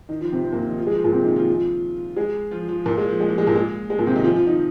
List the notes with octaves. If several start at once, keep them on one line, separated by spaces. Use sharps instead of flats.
D#3 D#4
F3 F4
C3 C4
C3 C4
A#2 A#3
F3 F4
D#3 D#4
F3 F4
G#3 G#4
F3 F4
A#2 A#3
C3 C4
D#3 D#4
F3 F4
G#3 G#4
F3 F4
F3 F4
A#2 A#3
G#3
F3
G#3
F3
G#3
A#2 A#3
G#3
G#3
A#2 A#3
C3 C4
D#3 D#4
F3 F4
F3 F4
D#3 D#4